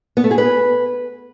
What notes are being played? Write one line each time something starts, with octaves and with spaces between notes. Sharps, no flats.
B3
A3
G#4
B4